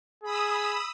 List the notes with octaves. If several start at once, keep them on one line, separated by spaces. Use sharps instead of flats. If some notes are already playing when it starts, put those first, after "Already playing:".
G#4 B5 D#6 E6